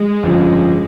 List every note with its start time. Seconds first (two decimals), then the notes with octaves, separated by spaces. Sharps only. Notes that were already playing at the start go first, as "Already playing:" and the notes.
Already playing: G#3
0.23 G1 F2 C#3 F3